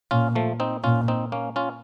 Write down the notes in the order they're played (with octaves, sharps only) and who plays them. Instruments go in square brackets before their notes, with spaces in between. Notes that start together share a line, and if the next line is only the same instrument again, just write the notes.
[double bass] A#2 [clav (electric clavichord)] C#4 F4
[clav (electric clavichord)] F3 A3
C4 D#4
[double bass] A#2 [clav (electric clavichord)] C#4 F4
[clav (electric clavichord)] C4 D#4
A#3 C#4
C#4 F4